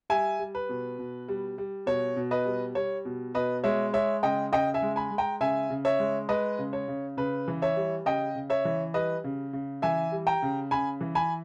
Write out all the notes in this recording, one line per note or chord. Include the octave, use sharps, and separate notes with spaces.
G3 E5 G#5
G3
B4
B2
B2
G3
G3
B2 C#5
B2
B4 D#5
G3
G3 C#5
B2
B2 B4 D#5
G#3 C#5 E5
G#3 C#5 E5
C#3 D#5 G5
C#3 D#5 G5
E5 G#5
G#3
G#5 B5
G#3
G5 A#5
C#3 E5 G#5
C#3
C#5 E5
G#3
G#3 B4 D#5
C#3
C#5
C#3
C#3 B4
E3
C#5 E5
G3
C#3 D#5 G5
C#3
C#5 E5
E3
G3 B4 D#5
C#3
C#3
E3 E5 G#5
G3
G5 A#5
C#3
C#3 G#5 B5
E3
G#5 B5